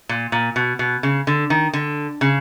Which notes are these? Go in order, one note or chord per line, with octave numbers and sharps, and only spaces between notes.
A#2
A#2
B2
B2
C#3
D3
D#3
D3
C#3